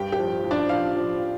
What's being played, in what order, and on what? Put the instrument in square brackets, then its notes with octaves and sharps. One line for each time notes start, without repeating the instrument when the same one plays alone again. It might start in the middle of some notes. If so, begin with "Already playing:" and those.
Already playing: [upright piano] G2 G4 G5
G4 G5
F3
F3
D4 D5
F3 F4 F5
F3